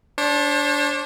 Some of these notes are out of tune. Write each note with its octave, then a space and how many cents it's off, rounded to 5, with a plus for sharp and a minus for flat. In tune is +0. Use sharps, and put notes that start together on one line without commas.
D4 -15 C5 +45